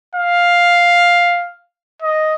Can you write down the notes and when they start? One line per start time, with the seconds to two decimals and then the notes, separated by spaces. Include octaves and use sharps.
0.15 F5
2.02 D#5